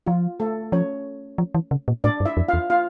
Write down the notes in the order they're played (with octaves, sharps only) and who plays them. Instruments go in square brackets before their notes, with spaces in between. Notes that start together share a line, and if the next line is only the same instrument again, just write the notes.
[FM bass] F3 [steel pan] F4
[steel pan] A3 A4
[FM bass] F3 [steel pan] C#4 C#5
[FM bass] F3
E3
C#3
A#2
[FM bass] A2 [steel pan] D4 D5
[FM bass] G2
[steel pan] E4 E5
[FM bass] F2
[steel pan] F4 F5
[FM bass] E2
[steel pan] F4 F5